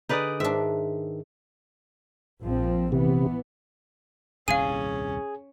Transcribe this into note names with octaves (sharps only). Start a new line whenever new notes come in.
D3 D#4 G#4 B4 D5 D#6
G#2 D#3 D4 E5
A#1 F3 C4
C3 E3 B3
D#1 C2 G2 C#4 G#4 F5 G#5 D#7